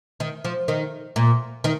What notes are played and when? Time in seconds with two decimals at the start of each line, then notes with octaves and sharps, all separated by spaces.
0.20 D#3
0.45 F3
0.68 D#3
1.16 A#2
1.64 D#3